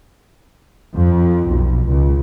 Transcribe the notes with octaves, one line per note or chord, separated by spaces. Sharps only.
F2
B1
C#2